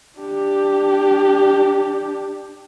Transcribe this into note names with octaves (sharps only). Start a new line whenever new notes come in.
D4 G4